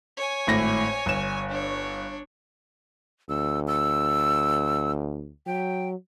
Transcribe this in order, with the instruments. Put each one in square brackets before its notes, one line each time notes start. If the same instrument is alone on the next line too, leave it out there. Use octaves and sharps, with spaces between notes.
[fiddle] C#5 G#5
[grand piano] G#1 A2 A#6
G1 E7
[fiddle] D4 C#5
[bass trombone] D2 [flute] E6
[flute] E6
[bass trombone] F#3 [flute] G5